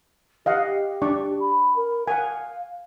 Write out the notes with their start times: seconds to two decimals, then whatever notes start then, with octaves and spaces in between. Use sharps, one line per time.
0.46 G4 D#5 F5 F#5
1.02 D4 D5 C#6
1.40 B5
1.76 A#4
2.08 F5 F#5 G#5